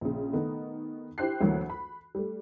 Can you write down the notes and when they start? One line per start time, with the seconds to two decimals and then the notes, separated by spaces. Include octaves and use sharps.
0.01 A#1 C#3
0.33 D#3 A3 B3 D#4
1.18 E4 G4 C5 G5 F#6 C7
1.41 D2 E3 F#3 A#3
1.70 B5
2.15 G3 A3